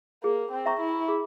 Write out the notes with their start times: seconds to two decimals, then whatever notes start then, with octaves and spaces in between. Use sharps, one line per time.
0.23 A#3 G#4
0.52 C4
0.66 E5 A#5 C#6
0.80 E4
1.08 G#4